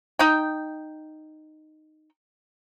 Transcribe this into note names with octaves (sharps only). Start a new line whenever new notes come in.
D#4 G5